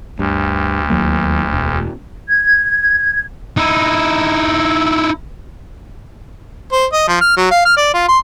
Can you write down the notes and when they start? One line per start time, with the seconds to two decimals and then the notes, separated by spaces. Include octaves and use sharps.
0.19 D2 G2
0.90 D#2 F#3 A#3
1.52 E1
2.29 G#6
3.57 D#4 E4
6.72 C5
6.92 D#5
7.08 F3
7.21 F6
7.37 F#3
7.51 F5
7.65 F6
7.77 D5
7.94 F4
8.08 C6